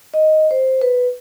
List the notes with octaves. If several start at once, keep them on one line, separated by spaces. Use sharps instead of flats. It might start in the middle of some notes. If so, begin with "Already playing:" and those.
D#5
C5
B4